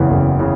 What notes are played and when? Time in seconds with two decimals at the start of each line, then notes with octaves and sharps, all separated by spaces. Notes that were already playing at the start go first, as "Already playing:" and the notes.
Already playing: F#1 E2 C#3 E3
0.10 F#1
0.39 C#3 E3